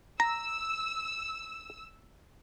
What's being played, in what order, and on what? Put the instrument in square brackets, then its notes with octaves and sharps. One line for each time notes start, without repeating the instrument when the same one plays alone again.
[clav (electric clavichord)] A#5 [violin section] E6